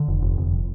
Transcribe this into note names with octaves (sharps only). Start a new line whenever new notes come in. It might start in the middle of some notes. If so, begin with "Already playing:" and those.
Already playing: D3
F1
F1
F1